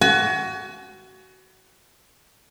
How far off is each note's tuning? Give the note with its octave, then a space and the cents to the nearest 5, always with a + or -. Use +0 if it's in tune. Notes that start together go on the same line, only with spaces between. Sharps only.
F#4 +25 G#5 +40